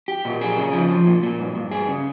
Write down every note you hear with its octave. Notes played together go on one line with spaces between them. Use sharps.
G4
A#2
G#4
C#3
F3
F3
A#2
A#2
G2
G2
G#4
C#3